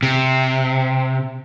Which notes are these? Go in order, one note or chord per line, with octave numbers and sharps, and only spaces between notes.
C3